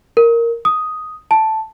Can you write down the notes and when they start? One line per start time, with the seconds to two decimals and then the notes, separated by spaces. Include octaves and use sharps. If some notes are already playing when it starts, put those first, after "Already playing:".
0.17 A#4
0.65 D#6
1.31 A5